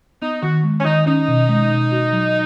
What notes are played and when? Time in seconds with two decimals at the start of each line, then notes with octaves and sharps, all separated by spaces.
0.22 B3 D#4
0.43 D#3 F#4
0.64 G#3
0.80 C#4
0.85 D#3 D#4
1.06 C#4 D#4
1.28 B2
1.49 G#3
1.70 B2
1.92 F#4
2.12 F#3